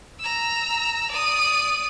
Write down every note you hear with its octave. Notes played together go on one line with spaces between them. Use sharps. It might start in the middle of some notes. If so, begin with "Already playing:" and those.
A#5 E6
D5 D#6